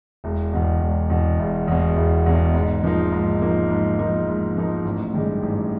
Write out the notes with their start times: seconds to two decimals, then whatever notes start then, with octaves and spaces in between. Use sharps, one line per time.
0.24 E1
0.53 E2 B2
0.81 E1
1.10 E2 B2
1.39 E1
1.68 E2 B2
1.96 E1
2.26 E2 B2
2.54 G#2
2.83 F3 A#3 D#4
3.12 G#2
3.41 F3 A#3 D#4
3.70 G#2
3.99 F3 A#3 D#4
4.28 G#2
4.56 F3 A#3 D#4
4.85 A1
5.14 G2 D#3 G#3
5.43 A1